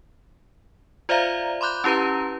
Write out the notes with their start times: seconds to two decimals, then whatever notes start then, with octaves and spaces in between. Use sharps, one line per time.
1.09 F4 C5 D5 E5 F5 A#5
1.61 B5 C6 D6 F#6 G6
1.84 C#4 E4 G4 B4 A#5